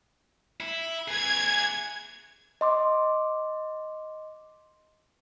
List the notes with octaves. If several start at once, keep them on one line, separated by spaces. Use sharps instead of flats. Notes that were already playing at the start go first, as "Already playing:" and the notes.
E4
G#4 B4 G#6
D#5 C6 D6